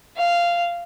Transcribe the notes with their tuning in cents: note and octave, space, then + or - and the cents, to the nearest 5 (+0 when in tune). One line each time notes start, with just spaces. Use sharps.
F5 -10